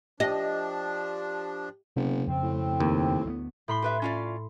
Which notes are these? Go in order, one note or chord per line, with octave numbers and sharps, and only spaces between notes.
F3 D4 G4 D#5
F#1 C3 B3
F2 C#3 C4
A2
D#2
D2 G#3 B3
A2 B5 C6
G4 B4 E5
C#4 F4 D5